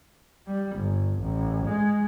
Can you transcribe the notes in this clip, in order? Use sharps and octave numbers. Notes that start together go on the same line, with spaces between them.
G3
G1
A1
G#3